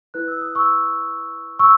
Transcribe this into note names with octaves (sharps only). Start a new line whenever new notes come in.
E4 B4 F#6
E6
D#6
C#6 E6
C#6 E6